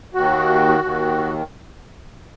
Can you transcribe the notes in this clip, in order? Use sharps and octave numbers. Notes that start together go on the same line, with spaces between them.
D#2 D#3 F#4
D#2 D#3